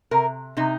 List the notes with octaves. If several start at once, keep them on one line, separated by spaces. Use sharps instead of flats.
C3 A#4
C3 D#4